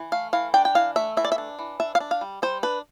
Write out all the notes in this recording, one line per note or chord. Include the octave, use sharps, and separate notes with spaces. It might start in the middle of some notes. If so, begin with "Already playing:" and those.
Already playing: E3
A3 F5
E3 F5
D4 G5
G5
E3 F5
A3 E5
E3 E5
D5
E5
D4
E3
D4 E5
F5
D4
F5
G3
G3 C5
D4 B4